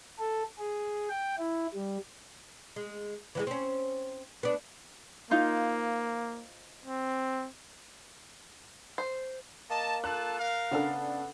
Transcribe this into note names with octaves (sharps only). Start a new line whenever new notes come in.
A4
G#4
G5
E4
G3
G#3
E3 F#3 G#3
C4 C#4
B3 D4
A#3 D#4 F4 C5
C4
C5
A#3 D#5 A5
F4 A4 A5 F#6
A#4 F5
C#3 B3 D4 A4